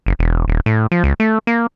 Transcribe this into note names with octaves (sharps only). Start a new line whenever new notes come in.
F#1
E1
D#1
A2
F3
C#2
A3
A#3